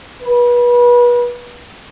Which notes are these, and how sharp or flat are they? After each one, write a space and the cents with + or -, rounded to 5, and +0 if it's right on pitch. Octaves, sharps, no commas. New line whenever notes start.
B4 -30